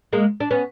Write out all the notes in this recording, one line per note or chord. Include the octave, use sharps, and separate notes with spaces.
G#3 A#3
D4
B3 C#4